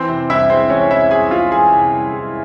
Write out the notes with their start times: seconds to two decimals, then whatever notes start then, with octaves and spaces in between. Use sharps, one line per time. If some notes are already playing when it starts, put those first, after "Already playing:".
Already playing: E3 C4 C5
0.09 C3
0.29 C2 E4 E5
0.50 G#3 C4 C5
0.70 E3 C#4 C#5
0.91 C3 E4 E5
1.11 C2 G#4 G#5
1.31 G#3 F4 F5
1.51 E3 G#4 G#5
1.72 C3
1.93 C2
2.13 G#3